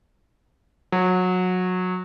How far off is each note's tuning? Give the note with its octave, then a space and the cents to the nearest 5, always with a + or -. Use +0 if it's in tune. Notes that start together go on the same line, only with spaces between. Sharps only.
F#3 -20